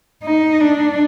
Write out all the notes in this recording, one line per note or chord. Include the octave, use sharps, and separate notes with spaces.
D#4
D4